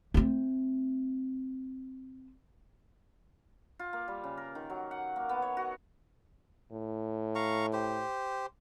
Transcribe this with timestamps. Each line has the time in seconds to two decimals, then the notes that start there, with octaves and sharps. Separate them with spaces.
0.14 A3 C4
3.79 F4
3.93 A#3
4.08 G3
4.24 C#3
4.37 A#4
4.55 D#3
4.70 F#3
4.91 F#5
5.16 A#3
5.29 B3
5.42 C#5
5.57 F#4
6.72 A2
7.35 F5 A#5 C#6
7.73 G4 C5